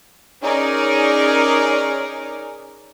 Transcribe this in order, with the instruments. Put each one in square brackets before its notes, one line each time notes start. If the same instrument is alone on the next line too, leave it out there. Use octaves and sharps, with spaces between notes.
[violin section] C#4 D#4 G#4 A#4 D5